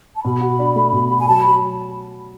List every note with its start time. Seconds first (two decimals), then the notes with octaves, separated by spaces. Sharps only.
0.16 A5
0.24 B2 B5
0.41 F#4
0.59 D4
0.76 A3
0.93 B2
1.09 F#4
1.19 G#5
1.27 F#3 A5
1.41 F#3 B5